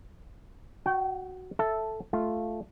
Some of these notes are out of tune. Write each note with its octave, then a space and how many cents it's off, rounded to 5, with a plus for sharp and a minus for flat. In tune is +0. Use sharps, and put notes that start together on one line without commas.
F#4 +0 G5 -35
A4 +0 E5 +0
A3 -5 F4 +0